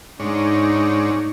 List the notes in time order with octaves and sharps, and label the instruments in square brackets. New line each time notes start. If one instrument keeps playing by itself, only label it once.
[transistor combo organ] G#2 D4 C#5 [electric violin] D#4